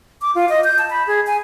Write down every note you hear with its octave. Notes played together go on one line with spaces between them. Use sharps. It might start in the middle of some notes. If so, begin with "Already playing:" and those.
D6
F4
D#5
G6
A5
B5
G#4
G#5